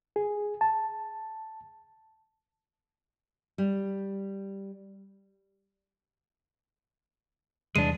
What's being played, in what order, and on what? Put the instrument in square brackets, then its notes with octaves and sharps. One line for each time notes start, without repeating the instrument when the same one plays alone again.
[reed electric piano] G#4
A5
[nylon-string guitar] G3
[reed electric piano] E2 [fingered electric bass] C3 G3 [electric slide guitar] G#3 D4 [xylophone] D#7